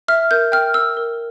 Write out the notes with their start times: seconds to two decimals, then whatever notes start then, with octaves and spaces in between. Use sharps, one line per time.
0.08 E5 F6
0.31 A#4 G6
0.52 G5 F6
0.74 A#4 E6
0.97 A#4